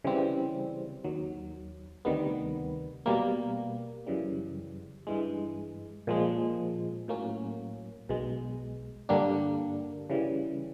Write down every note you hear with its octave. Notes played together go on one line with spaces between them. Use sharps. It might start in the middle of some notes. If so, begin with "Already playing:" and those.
C#3 E3 G3 C4
D#2 D#3 F#3
D2 C3 D#3 G3 B3
B2 G3 A#3
F#2 C#3 E3 G3
G2 E3 G#3
A#2 F3 G#3
A2 F#3 A#3 C#4
B1 B2 G#3
G2 D3 G3 A#3 D4
C#3 E3 G3